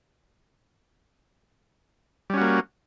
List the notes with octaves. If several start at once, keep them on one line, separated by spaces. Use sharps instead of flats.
G3 A#3 C#4 F#4